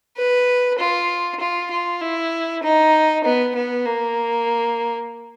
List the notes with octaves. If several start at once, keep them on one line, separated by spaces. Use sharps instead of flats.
B4
F4
F4
F4
E4
D#4
B3
B3
A#3